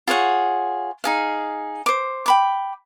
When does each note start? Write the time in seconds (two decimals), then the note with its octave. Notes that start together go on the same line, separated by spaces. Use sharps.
0.07 F4 G#4 C#5 F#5
1.04 D#4 G#4 F5
1.86 C5 D6
2.26 G5 B5 D6